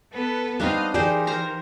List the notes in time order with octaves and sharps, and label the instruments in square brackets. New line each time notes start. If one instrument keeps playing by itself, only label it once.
[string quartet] B3 A4 B4
[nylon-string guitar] G3 C4 [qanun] B3 D4 D#4 [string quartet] D#5 F5
[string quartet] E3 A#4 [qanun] D#4 G4 C5 [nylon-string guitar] G#4 D5
[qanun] C5 F5 A#5